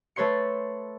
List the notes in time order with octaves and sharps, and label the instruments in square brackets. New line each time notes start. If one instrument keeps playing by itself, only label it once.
[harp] A3 A4 B4 C#5 C6 C#7